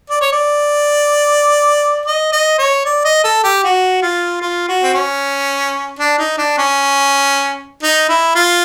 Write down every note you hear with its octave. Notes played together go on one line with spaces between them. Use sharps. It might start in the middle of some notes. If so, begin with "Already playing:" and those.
D5
C#5
D5
D#5
D#5
C#5
D5
D#5
A4
G4
F#4
F4
F4
F#4
C4
C#4
D4
D#4
D4
C#4
D#4
E4
F4